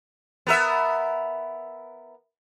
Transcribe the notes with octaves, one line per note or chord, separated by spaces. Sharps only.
B3 A#4 E5